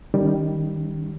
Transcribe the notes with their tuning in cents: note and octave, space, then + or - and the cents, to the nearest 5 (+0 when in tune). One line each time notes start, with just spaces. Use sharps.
D#3 +0 G3 +0 C#4 +35